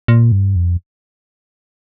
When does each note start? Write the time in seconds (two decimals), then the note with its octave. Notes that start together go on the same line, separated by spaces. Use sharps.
0.08 A#2
0.32 G2
0.56 F2